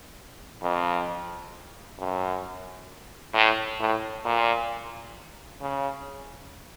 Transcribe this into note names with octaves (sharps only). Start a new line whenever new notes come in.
F2
F#2
A2
A2
A#2
C#3